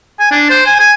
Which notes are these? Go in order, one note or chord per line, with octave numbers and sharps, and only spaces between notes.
G#5
D4
C5
G#5
G#5